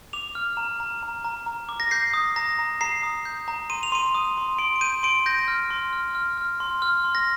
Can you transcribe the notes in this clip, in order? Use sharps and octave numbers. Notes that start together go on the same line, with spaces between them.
D6 F7
F6
A#5
A#5
A#5
A#5
A#5
D6
A#6
G6 C7
D#6
A#5 A#6
A#5
A#5 C7
D#6
G6
A#5
C6 D#7
F7
C6 D#7
D#6
C6
C6 D7
D7
G6 D#7
C6 D7
G6 A#6
F6
C6
F6
F6
F6
C6
F6
C6
A#6